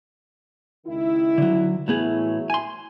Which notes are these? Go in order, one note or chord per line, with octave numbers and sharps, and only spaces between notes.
C#2 D#3 E4
D3 F#3
A2 E3 F#3 B3 G#4 E5
G#5 C6